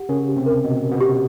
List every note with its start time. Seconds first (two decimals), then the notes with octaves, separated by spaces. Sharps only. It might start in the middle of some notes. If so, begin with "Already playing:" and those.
Already playing: G4 F#5
0.09 C#3 C#4 A#4
0.28 G4
0.36 C3 C4
0.46 A#4
0.64 B2 B3 D#5
0.83 A#4
0.91 B2 B3
1.01 G4